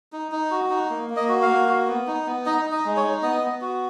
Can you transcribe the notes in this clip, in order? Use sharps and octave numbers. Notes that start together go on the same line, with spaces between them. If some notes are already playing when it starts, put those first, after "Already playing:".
D#4
D#4
F#4
D#4
A#3
A#3
D#5
F#4
F5
A#3
F#4
B3
D#4
B3
D#4 D#5
D#4
D#5
G#3
C#5
D#4
B3 D#5
B3
F#4